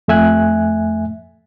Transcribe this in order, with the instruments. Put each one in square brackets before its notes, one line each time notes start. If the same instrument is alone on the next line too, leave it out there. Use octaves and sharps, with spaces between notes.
[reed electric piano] F2 A3 E5 G#5 F#6